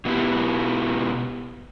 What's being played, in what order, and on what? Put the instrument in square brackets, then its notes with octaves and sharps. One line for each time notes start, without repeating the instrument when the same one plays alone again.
[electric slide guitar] B2 B3 E4 G4